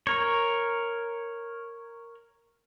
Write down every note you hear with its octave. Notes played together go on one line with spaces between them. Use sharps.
A#4 C#5